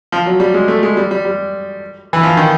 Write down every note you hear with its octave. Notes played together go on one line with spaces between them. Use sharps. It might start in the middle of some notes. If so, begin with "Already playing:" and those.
F3
F#3
G3
G#3
A3
G#3
G3
G3
G3
E3
F3
D#3